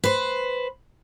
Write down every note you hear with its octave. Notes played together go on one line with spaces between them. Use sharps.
B4 C5